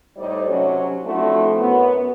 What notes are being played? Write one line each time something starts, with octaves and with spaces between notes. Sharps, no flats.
A2 G3 D#4 C5 D5
C3 F#3 C#4
F3 A3 C4 D4 E4 F#4
F#2 B3